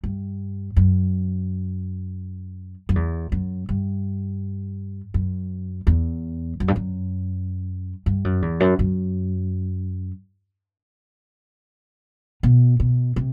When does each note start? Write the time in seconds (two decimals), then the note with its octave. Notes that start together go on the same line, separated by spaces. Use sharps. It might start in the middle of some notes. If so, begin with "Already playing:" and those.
0.04 G2
0.76 F#2
2.89 F#2
2.95 E2
3.32 F#2
3.69 G2
5.14 F#2
5.87 E2
6.60 F#2
6.68 G2
6.76 F#2
8.06 G2
8.24 F#2
8.42 E2
8.60 F#2
8.79 F#2
12.43 B2
12.80 B2
13.16 C3